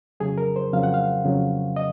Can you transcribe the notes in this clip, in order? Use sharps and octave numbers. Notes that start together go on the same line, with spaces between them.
F2 C#3 F#3 G#4
A#4
C5
F2 C#3 F#3 F5
F#5
F5
F2 C#3 F#3
D#5